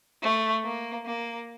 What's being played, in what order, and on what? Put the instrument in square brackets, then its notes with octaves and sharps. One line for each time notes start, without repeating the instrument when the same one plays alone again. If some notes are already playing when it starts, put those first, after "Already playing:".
[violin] A3
A#3
A#3